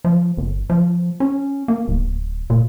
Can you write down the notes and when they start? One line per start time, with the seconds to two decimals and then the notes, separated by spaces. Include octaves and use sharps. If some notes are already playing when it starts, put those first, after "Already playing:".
0.05 F3
0.37 G1
0.70 F3
1.20 C#4
1.68 A#3
1.88 D1
2.50 A#2